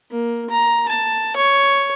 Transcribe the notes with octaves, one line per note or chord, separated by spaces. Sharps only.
A#3
A#5
A5
C#5